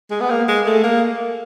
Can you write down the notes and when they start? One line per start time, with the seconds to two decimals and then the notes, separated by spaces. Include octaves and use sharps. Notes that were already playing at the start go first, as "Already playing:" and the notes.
0.11 G#3
0.20 B3
0.30 A#3
0.48 G#3
0.66 A3
0.84 A#3